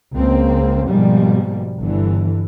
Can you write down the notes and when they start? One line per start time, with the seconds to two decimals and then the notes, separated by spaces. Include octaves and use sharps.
0.14 C#2 C#3 A#3 C4
0.89 G#2 B2 F3 G3 G#3 A#3
1.79 G1 D3 E3